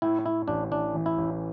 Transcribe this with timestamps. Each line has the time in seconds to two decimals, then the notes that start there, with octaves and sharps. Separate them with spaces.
0.02 A2 E4
0.25 A2 E4
0.48 A1 D4
0.71 E3 D4
0.94 E3
1.06 E4
1.18 A1